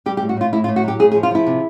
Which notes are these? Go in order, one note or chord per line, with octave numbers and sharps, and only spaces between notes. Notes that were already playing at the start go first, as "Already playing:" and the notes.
G3 G4
G4
A2
F#4
A2 F4
A2 E4
F4
A2
F#4
F#3 G4
A2 G#4
G#4
F3
F4
F3 E4
C3